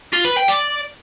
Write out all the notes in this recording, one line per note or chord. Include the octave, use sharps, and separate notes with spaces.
F4
B4
G5
D5